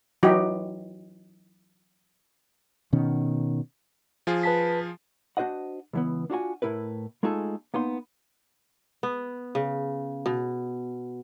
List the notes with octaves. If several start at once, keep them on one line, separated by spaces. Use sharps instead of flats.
E3 F#3 D#4 F#4 G4
B2 D#3 C#4
F3 F4 G#4
B4 A5 B6
D4 F#4 C5 D#5 F#5
C#2 E3 B3
D4 F4 F#4 G#5
A2 E4 A#4 B4
G#3 A3 D#4 F4 G#4 A4
A#3 B3 D#4 C6
B3
C#3
B2